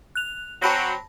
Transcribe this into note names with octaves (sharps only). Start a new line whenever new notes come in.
F#6 F7
F#3 C4 A5 B5 A#6